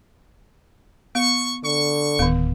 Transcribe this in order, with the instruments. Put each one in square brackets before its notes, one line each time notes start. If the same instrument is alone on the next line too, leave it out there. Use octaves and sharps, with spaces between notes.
[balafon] B3 [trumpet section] C#6
[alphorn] D3 [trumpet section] C#6
[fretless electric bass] D1 [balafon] D#3 B3